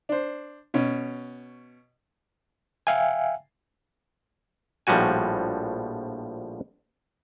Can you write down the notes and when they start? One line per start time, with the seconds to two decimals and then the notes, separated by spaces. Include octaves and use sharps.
0.09 D4 C5
0.74 B2 C#4
2.87 E5 F5 G5 G#5
4.87 A#1 A2 F3 G3 F#4 G#5